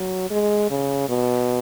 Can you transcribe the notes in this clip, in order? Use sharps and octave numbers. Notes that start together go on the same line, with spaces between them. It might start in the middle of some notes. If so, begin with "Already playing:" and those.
Already playing: F#3
G#3
C#3
B2